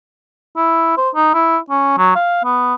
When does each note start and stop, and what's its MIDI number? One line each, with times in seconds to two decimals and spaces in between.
0.57 0.93 64
0.97 1.09 72
1.15 1.33 63
1.34 1.57 64
1.70 1.94 61
1.98 2.12 54
2.15 2.43 77
2.44 2.74 59